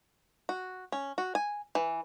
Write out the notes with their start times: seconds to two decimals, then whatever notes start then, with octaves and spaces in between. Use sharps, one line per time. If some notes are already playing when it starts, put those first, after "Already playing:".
0.49 F#4
0.92 C#4
1.18 F#4
1.35 G#5
1.75 E3